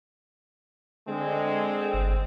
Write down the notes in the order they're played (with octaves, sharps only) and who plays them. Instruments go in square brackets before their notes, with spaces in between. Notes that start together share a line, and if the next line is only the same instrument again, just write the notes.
[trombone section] D3 G#3 [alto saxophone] C4
[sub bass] G1